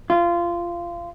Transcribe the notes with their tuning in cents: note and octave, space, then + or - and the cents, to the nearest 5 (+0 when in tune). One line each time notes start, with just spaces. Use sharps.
F4 -20